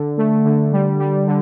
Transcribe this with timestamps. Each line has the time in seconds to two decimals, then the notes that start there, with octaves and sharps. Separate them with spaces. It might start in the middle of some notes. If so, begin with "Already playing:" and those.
Already playing: D3
0.17 A3
0.45 D3
0.72 G3
0.99 G3
1.27 D3